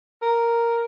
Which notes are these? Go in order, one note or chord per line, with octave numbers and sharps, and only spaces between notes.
A#4